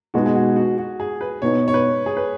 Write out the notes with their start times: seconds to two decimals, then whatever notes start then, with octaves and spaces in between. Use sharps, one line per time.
0.14 B2 G#3 B3 D#4 F#4
0.26 G#4
0.35 F#4
0.56 F#4
0.78 F#4
1.00 G#4
1.21 B4
1.42 B2 B3 D#4 C#5
1.68 C#5
1.74 B4
2.06 G#4
2.17 B4